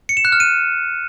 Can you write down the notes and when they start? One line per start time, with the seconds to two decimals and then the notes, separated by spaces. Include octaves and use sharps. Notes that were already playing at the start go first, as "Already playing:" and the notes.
0.09 C#7
0.17 E7
0.25 F#6
0.32 F6
0.40 D#7